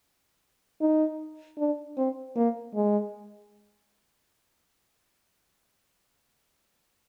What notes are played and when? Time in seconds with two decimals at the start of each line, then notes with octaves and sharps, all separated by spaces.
0.81 D#4
1.58 D4
1.97 C4
2.36 A#3
2.74 G#3